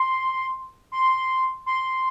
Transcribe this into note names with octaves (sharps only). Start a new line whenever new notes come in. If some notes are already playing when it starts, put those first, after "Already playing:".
Already playing: C6
C6
C6